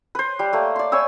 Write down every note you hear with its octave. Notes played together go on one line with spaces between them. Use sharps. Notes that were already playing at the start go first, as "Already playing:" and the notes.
B4 C5
G3
A3 A#3
D5 C6
C#5 G#5 B5 E6